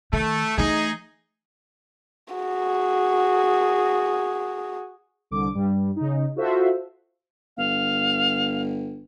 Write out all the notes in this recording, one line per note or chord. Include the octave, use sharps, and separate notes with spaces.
D#3 A3
E3 A3 D#4 G#4
F#4 G#4
C2 D3 D6
G2 G3
C#3 D#4
F4 F#4 A4 C5 E5
G1 F5